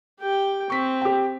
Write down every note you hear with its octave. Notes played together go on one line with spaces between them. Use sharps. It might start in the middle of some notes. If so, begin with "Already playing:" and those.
G4 G5
C4 C#6 B6
G4 G5